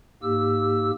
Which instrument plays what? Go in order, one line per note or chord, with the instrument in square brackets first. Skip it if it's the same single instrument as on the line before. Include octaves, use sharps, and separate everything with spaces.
[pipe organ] G#2 A#3 G4 E6